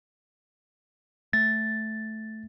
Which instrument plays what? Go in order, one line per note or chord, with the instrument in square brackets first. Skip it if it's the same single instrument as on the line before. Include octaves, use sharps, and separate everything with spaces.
[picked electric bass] A3 [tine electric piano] A6